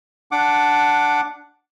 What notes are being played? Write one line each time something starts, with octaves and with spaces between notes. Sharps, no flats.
D4 F#5 D6